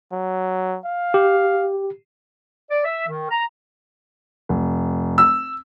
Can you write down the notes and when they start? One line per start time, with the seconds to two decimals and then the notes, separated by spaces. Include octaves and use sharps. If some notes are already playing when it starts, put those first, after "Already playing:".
0.12 F#3
0.85 F5
1.14 G4
2.71 D5
2.85 E5
3.08 D#3
3.31 A#5
4.49 F1
5.18 E6